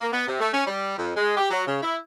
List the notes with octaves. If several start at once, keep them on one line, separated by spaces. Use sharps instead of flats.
A#3
B3
C3
A3
C#4
G3
F2
G#3
G4
F#3
C#3
E4